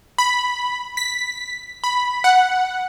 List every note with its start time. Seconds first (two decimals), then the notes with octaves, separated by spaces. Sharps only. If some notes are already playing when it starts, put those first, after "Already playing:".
0.18 B5
0.97 B6
1.84 B5
2.24 F#5